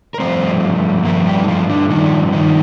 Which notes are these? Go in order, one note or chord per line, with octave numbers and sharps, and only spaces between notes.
A#4
G2 F3 A3 C4 C5
G2 F3 A3 A#3 A#4
G3 G4
D#4
F3 F4
D3 D4
G2 D3 D#3 F3 D#4
D#3 D#4